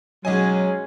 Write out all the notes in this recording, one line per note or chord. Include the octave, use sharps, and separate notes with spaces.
B1 F#3 G#3 C#4 C#5 D#5 G#5